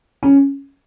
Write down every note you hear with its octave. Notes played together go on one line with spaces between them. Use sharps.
C#4